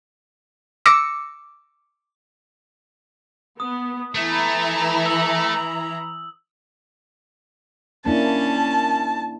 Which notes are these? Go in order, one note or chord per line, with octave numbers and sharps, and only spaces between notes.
D6 E6 A#6 C#7
B3 D#6
E3 A3 E4 A#5
E6 F#7
A#3 C#4 D4 E4 A5